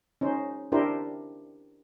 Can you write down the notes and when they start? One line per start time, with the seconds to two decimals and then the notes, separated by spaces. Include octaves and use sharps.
0.21 C#4 D#4 C5
0.72 D4 E4 G4 A#4 C5